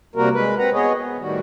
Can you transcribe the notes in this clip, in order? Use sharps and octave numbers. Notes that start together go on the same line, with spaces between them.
C3 G3 A#3 F#4 A#4
G#3 B4
C4 B4 F#5 A#5
B3 F#4 G#4 C#5 D#5
B3
A2 D#3 G3 F#4